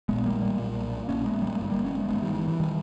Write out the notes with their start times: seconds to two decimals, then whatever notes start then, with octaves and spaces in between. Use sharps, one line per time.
0.09 A#1 A#2 G#3 B3
0.26 G3 A#3
0.42 G3 A#3
0.59 B1 A#2
1.09 A#1 G#2 A#3 C#4
1.26 G#3 B3
1.42 G3 A#3
1.59 G1 G2
1.72 G3 A#3
1.84 A#3 C#4
1.97 G#3 B3
2.09 G#1 G2 G#3 B3
2.22 D#3 G3
2.35 E3
2.48 E3
2.60 D#3 G3